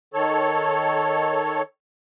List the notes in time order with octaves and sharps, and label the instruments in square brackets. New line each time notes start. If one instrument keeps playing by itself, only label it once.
[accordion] D#3 A4 C#5